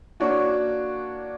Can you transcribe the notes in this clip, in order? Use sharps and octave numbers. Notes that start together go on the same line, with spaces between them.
A#3 D4 F#4 C#5